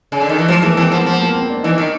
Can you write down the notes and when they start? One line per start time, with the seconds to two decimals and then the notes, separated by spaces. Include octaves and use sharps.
0.12 C#3
0.21 D3
0.29 D#3
0.39 E3
0.48 F3 G#3
0.62 E3 A#3
0.77 E3 C4
0.92 F3 B3
1.06 F3 B3
1.20 A#3
1.34 C4
1.50 D4
1.63 E3 D#4
1.78 D#3